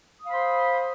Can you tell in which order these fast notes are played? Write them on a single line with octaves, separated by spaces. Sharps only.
D#6 F5 B5 C5 C6